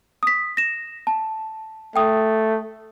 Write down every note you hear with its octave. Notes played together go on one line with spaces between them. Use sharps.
D#6 B6
A#6 E7
A5
A3 G5 D#6